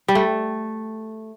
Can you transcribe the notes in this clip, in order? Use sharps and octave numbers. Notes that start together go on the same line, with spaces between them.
G3
A3